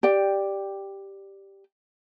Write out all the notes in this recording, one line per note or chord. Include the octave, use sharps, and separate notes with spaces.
G4 D5 G5